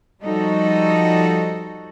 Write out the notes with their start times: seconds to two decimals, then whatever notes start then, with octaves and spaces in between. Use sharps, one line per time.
0.23 F3 G3 D#4 F#4 A4